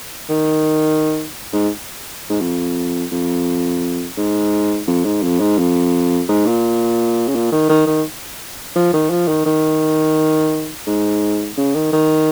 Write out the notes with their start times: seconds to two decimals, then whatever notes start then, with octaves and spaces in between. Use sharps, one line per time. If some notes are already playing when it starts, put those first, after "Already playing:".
0.29 D#3
1.53 G#2
2.29 G#2
2.41 F2
3.11 F2
4.17 G#2
4.88 F2
5.05 G#2
5.23 F2
5.40 G#2
5.58 F2
6.28 G#2
6.46 A#2
7.28 C#3
7.35 A#2
7.52 D#3
7.69 D#3
7.87 D#3
8.75 F3
8.93 D#3
9.10 F3
9.28 D#3
9.45 D#3
10.87 G#2
11.57 C#3
11.75 D#3
11.92 D#3